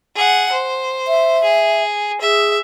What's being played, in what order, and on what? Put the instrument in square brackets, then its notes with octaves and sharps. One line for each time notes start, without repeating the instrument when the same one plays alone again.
[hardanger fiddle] G#4 F#5
C5
[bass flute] E5
[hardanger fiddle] G#4
[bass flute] G#4 [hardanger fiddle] E5